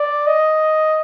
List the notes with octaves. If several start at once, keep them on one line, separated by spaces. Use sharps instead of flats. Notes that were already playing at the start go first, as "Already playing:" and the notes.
Already playing: D5
D#5